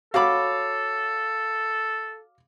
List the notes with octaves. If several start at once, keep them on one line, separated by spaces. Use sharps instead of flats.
F#4 A4 C#5 F5 B5 D6